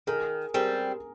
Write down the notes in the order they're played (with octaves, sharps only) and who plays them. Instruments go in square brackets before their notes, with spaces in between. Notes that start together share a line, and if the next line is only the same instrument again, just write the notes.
[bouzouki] D#3 [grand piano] G#4 A#4
[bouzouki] G3 C4 [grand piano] G#4 A#4